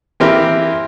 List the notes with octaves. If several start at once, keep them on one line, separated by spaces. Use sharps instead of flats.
E3 A#3 C4 E4 G4 A#4